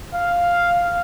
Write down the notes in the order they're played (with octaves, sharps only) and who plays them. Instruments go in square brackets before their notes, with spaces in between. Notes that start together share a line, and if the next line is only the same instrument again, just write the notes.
[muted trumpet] F5